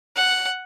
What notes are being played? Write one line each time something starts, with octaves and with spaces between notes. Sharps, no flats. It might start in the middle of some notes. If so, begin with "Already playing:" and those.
F#5